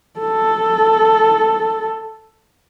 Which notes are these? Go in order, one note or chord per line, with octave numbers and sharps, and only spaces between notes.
A4